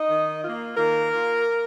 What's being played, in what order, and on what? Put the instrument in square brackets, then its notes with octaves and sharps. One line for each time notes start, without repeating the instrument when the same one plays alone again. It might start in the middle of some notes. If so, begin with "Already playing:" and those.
Already playing: [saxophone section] D#4 D#5
D#3
A#3 F4
D#3 A#3 A#4
A#3 F4